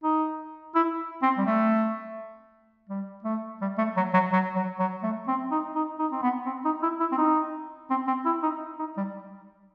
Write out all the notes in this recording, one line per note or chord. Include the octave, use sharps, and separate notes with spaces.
D#4
E4
C4
G3
A3
G3
A3
G3
A3
F#3
F#3
F#3
F#3
F#3
A3
C4
D#4
D#4
D#4
C4
B3
C4
D#4
E4
E4
C4
D#4
C4
C4
E4
D#4
D#4
G3